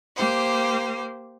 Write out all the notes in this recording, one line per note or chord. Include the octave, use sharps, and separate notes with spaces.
A#3 G4 C5